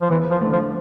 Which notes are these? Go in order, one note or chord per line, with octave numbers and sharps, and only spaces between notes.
F3
E2 E3
F3
D3 A3
F3